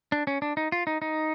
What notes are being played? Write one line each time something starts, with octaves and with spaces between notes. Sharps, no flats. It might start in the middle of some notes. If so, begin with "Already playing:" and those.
D4
C#4
D4
D#4
F4
D#4
D#4